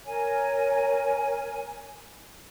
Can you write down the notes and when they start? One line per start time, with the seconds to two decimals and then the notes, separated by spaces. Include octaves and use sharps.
0.06 A#4 C#5 G#5